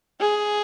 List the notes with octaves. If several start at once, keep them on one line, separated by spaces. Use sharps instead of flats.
G#4